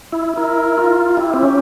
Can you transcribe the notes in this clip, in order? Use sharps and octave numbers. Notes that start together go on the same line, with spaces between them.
E4
E4 A#4
F4
E4 G4
C4
C#4